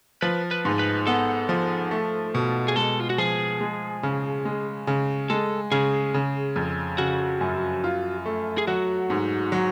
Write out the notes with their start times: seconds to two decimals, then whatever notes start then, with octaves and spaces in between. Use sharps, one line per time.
0.22 F3 B4
0.51 B4
0.65 G#2
0.79 B4
1.07 B3 A4
1.49 F3
1.91 A3
2.35 B2
2.68 G#4
2.76 G#3 A4
3.00 F4
3.10 F#4
3.18 F3 G#4
3.61 G#3
4.03 C#3
4.45 G#3
4.87 C#3
5.30 G#3 A4
5.72 C#3 G#4
6.14 C#3
6.56 F2
6.98 C#3 F#4
7.41 F#2
7.84 F4
8.26 A3
8.58 G#4
8.67 F#3 F#4
9.10 G#2
9.52 F#3